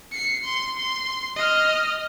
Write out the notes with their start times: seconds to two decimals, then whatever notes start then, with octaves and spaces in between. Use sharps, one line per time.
0.12 C7 C#7
0.43 C6
0.78 C6
1.36 D#5 F6